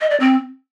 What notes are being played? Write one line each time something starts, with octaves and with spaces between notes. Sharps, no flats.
D#5
D5
C4